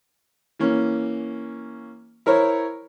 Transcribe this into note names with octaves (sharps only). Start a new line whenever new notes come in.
E3 A#3 C#4
E4 A#4 C5 C#5